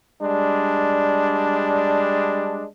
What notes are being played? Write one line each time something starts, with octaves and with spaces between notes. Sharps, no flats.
G3 G#3 D4